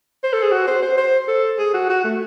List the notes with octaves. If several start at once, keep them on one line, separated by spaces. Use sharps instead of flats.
C5
A4
G#4
F#4
C5
C5
C5
A4
G#4
F#4
F#4
A3